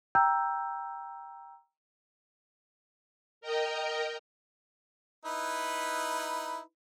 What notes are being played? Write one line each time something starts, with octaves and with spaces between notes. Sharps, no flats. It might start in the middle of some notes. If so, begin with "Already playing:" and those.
G5 A#5 E6 G6
A#4 D#5 G5 A#5
D#4 E4 B4